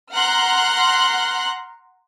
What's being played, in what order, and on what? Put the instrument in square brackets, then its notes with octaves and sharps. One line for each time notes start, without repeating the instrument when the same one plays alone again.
[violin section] F#5 A#5 C6 F6 F#6